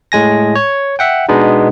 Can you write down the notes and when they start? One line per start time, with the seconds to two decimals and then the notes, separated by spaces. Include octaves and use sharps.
0.12 A2 G#3 G#5 A#6
0.55 C#5
0.99 E5 F#5 G5
1.29 B2 G#3 B3 D4 D#4